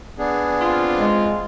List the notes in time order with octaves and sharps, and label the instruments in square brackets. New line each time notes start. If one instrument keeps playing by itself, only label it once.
[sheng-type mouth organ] B3 D4 G#4
[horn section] C4 F4
[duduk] G#3